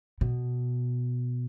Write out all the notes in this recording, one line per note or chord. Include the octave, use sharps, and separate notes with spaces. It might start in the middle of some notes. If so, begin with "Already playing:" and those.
B2